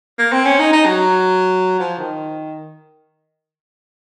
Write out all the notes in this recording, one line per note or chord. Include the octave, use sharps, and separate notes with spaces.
A#3
C4
C#4
D#4
D#4
F#3
F3
D#3